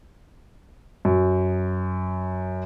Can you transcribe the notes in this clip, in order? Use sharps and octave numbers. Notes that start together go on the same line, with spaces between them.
F#2 F#3